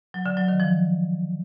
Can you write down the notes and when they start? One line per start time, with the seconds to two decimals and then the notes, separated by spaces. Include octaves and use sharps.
0.14 F#3
0.26 D3
0.37 F#3
0.48 D#3
0.60 F3